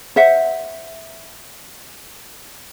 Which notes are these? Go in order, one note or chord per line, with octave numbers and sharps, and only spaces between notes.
C5 E5 F#5